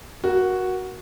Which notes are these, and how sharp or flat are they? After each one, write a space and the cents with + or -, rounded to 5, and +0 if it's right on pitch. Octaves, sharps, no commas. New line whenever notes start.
A#3 +25 F#4 +0